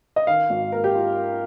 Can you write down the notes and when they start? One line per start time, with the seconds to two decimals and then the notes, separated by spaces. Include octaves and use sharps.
0.16 D#5
0.27 D#3 F5
0.50 G#1
0.72 A#3 A#4
0.84 G4
0.95 F4